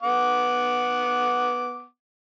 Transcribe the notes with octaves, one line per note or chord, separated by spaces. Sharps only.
B3 F#5 D6